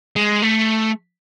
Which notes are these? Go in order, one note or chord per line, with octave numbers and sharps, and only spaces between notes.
G#3
A3